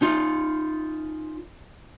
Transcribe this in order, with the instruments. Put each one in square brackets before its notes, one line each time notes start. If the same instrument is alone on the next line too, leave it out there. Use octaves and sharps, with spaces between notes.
[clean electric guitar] C#4 D#4 F4